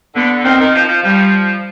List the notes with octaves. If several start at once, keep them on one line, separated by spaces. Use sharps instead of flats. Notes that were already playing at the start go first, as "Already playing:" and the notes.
D3 B3
D#3 C4
D#3
F3
F3
F3 G3